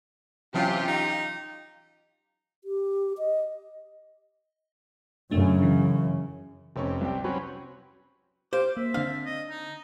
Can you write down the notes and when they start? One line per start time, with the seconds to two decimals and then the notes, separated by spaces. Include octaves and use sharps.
0.54 C3 E3 F#3 C#4 F4 G4
0.88 D#4
2.64 G4
3.18 D#5
5.31 F#2 C#3 A3 D4
5.62 E3
6.76 F1 C3 C#4 C#6
7.01 C2 G4
7.24 F#3 C4 C#4 B4
8.53 G4 C5 F5 D6
8.77 A#3 E5
8.94 D3 C4 D4 F5
9.26 D#5
9.50 D#4